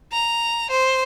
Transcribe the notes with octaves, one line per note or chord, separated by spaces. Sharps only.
A#5
C5